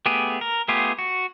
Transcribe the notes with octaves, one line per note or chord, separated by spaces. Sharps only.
A3 B3 G4 G#4
A#4
A3 B3 F4 G4 G#4
F#4